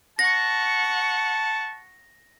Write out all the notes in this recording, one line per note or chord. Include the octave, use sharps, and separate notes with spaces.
F#5 A5 C#6 A#6